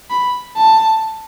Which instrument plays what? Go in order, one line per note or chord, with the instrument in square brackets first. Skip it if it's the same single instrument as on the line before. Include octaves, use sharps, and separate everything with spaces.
[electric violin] B5
A5